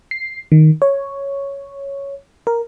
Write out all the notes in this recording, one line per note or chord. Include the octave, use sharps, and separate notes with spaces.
C7
D#3
C#5
A#4